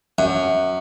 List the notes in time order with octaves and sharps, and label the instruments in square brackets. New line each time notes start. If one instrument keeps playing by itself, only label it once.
[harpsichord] F#2